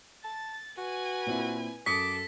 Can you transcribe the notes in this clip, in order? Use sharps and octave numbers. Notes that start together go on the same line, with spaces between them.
A5 A6
F#4 B4 G#5
A#2 C4 E4
F#2 A4 D6 D#6 B6 C#7